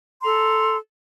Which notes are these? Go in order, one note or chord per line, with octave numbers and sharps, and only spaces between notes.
A4 A#5 C6